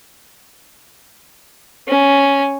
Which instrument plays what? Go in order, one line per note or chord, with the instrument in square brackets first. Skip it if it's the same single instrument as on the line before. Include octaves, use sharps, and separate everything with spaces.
[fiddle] C#4